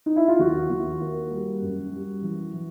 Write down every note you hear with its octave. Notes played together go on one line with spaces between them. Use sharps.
D#4
E4
F4
D#2 F#4
D#2
A#3
G3
F#2
G3
E3
E3